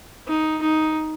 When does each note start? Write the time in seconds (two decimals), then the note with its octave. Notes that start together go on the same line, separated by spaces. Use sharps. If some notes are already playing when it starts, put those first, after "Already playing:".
0.27 D#4
0.62 D#4